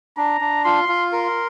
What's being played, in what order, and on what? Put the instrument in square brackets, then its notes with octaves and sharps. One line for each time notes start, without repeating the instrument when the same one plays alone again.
[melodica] D4 [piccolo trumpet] A#5
[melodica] D4
[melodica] F4 [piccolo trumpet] C6
[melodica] F4
[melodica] A#4 [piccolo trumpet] C6